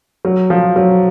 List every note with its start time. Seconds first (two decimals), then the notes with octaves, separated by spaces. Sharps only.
0.25 F#3
0.50 F3
0.76 F#3